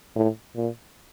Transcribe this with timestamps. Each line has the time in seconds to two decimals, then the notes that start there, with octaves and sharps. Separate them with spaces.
0.16 A2
0.56 A#2